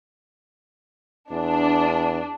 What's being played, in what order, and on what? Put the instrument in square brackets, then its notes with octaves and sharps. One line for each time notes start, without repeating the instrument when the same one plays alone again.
[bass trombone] E2 [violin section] D4